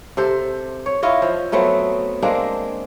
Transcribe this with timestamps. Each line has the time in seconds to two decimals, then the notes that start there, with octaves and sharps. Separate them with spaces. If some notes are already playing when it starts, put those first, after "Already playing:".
0.17 C3 A4 C5
0.86 C#5
1.03 E4 F4 C#5 D#5
1.22 F3
1.52 F#3 A3 B3 C4
2.22 G#3 A#3 C4 D4